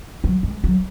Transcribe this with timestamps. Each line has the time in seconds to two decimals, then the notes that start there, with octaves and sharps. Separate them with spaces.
0.24 F#3
0.43 G#3
0.64 F#3